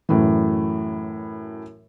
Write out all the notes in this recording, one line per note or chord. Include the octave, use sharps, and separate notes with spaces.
F#2 A2 E3